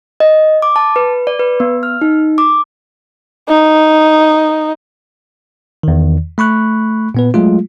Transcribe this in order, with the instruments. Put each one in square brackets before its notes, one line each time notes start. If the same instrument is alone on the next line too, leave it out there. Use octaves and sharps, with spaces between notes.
[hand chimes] D#5
D6
A5
B4
D5
B4
B3
F6
D#4
D6
[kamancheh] D#4
[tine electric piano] E2 D#3
A3 B5 C#6 F#6
A#2 B3 B4
F#3 G#3 A3 F4